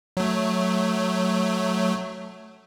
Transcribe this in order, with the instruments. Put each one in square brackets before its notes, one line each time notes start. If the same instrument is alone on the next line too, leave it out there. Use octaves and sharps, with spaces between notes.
[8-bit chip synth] F#3 A3